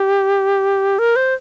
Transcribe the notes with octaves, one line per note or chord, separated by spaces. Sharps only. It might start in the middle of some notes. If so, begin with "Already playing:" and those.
Already playing: G4
A#4
C5